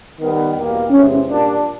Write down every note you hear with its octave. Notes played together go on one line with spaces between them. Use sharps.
D#3 G3 B3
E2 B2 G3 A#3
E2 C3 E3 G#3 C4 C#4
A#2 G3 A#3 D4